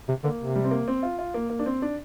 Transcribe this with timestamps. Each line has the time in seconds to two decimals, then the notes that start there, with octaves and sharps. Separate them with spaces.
0.08 C3
0.24 D3 A#3
0.40 C3
0.56 G3
0.64 C4
0.71 A#3
0.88 C4
1.03 F4
1.19 F4
1.34 A#3
1.50 A#3
1.59 D4
1.66 C4
1.82 D4